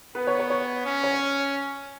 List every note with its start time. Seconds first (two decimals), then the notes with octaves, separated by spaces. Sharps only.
0.15 B3 B4
0.27 C#5
0.40 C#5
0.50 C#5
0.86 C#4
1.04 C#5